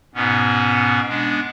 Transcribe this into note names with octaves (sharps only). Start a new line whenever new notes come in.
G#2 B2 B3 C#4
G#3 B3 D4